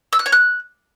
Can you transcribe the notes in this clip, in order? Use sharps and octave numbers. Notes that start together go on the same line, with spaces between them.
E6
F#6
C#5
F#6